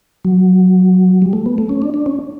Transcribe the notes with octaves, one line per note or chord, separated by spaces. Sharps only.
F#3
G3
A3
B3
A3
C#4
D4
D4
C#4